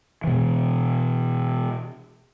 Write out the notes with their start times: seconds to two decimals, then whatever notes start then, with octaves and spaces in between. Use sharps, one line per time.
0.24 B2 E3